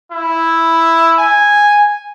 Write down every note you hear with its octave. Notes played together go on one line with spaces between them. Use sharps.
E4
G#5